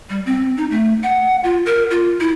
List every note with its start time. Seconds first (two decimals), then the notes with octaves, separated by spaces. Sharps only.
0.10 G3
0.26 C4
0.57 D#4
0.71 A3
1.03 F#5
1.44 F4
1.66 A#4
1.91 F4
2.21 E4